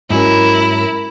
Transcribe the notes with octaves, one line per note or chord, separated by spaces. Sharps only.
G#2 F#3 C#4 E4 A#4